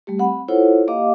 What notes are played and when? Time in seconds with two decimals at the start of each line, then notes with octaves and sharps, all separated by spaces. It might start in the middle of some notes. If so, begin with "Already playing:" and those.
0.07 G3 A3 G4
0.19 C4 F#5 B5
0.48 E4 F4 A4 C5 C#5 F#5
0.88 A#3 G4 D#5 F5 D6